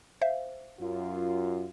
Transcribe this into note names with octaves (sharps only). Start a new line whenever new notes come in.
C5 E5 F5
F#2 F4